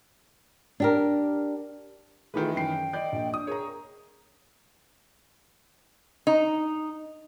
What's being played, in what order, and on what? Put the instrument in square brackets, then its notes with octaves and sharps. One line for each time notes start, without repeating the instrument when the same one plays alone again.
[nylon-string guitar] D4 G4 A#4
[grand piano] D#3 E3 B4 [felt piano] A3 D#4 F4 [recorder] G#4
[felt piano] F#2 C7 [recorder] G5
[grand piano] D5 [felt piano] D#5 G6
[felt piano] A#1 D#5
[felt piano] D4 [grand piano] D#6
[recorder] G#4 [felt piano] A#4 A#5 [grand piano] C#5
[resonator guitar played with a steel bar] D#4